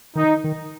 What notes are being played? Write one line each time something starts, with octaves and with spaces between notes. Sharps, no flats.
D#3 D#4
D#3